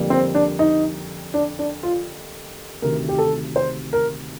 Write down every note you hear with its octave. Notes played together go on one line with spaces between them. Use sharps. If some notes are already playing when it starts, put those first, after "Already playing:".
Already playing: F2 D3 G3 A#3
C4
D4
D#4
D4
D4
F4
D2 C3 D#3 A#4
G4
A4
C5
A#4